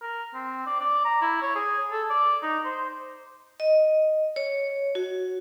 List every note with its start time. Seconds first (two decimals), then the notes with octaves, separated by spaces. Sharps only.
0.02 A#4
0.34 C4
0.66 D5
0.80 D5
1.05 A#5
1.22 E4
1.42 C#5
1.55 G#4
1.91 A4
2.10 D5
2.42 D#4
2.65 C5
3.60 D#5
4.36 C#5
4.95 F#4